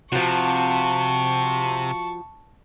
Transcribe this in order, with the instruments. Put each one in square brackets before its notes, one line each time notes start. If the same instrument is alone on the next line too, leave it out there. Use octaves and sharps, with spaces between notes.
[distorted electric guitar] C3 [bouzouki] F3 F#4 [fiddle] A5 C#6